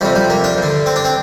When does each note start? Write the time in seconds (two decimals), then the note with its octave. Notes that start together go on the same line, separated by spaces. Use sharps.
0.01 F2 C3 G3
0.15 G3
0.30 A#3
0.44 D4
0.57 G2 D3
0.86 C4
0.96 D4
1.05 C4